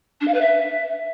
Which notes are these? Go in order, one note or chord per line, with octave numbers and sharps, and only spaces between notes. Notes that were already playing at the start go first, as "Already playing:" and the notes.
D4
F5
B4
E5